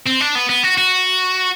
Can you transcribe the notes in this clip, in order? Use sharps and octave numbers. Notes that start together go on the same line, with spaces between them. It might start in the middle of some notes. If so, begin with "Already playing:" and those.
C4
D4
B3
B3
F#4
F#4